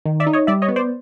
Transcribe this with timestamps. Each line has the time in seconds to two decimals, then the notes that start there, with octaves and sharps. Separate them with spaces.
0.05 D#3
0.20 D5 E5
0.27 D#4
0.33 C#5 D#5
0.47 G3 D5 E5
0.62 C#5 D#5
0.68 B3
0.76 C5 D5